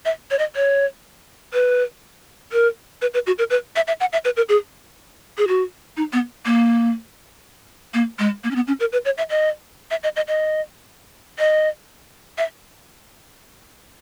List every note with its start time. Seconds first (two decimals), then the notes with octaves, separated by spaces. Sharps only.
0.05 E5
0.31 C#5
0.39 D#5
0.56 C#5
1.53 B4
2.52 A#4
3.02 B4
3.14 B4
3.27 F#4
3.38 A#4
3.50 B4
3.76 E5
3.88 E5
4.00 F#5
4.13 E5
4.25 B4
4.37 A#4
4.49 G#4
5.38 G#4
5.48 F#4
5.97 D#4
6.13 B3
6.46 A#3
7.94 A#3
8.19 G#3
8.44 A#3
8.51 C#4
8.56 B3
8.67 C#4
8.80 A#4
8.92 B4
9.05 C#5
9.18 E5
9.30 D#5
9.91 E5
10.03 D#5
10.16 D#5
10.28 D#5
11.39 D#5
12.38 E5